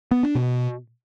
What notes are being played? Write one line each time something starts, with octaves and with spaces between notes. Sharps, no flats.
B3
D4
B2